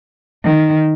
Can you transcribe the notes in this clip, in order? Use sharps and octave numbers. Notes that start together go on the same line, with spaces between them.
D#3